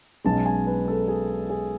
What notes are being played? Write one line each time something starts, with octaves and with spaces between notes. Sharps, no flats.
B1 B2 G#3 C#4 A5
G#5
B4
A4
G#4
G#4